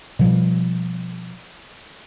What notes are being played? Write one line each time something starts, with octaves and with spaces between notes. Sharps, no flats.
B2 F3 G3